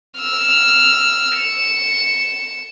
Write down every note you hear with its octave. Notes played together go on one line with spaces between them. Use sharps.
E6 F6
C#7 E7